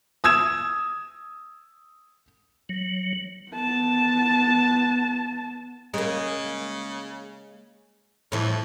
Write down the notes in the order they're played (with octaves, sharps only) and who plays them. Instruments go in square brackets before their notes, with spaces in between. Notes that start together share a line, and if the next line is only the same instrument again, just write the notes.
[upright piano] D#6 E6 G#6 E7
[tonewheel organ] F#3
[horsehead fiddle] B3 A5
[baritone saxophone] C#3 [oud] G#3 A#3
[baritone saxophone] F2 [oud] A2 E3